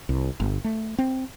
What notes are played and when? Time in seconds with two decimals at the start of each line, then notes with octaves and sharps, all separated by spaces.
0.09 C2
0.40 G1
0.64 A3
0.98 C4